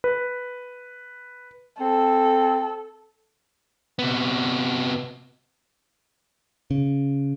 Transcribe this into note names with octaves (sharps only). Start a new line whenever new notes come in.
B4
C4 A4
C3 B3
C#3